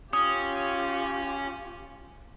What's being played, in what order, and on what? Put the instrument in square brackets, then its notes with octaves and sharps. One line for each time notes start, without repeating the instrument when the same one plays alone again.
[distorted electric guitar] C#4 [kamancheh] F4 G4 [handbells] D#6